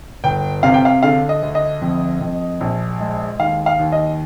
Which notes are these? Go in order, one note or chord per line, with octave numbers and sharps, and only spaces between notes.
G1 G5
C3 F5
G5
F5
D3 F5
D#5
D2
D#5
F2
F2
A#1
G#3
D#2 F5
F5
D#2
D#5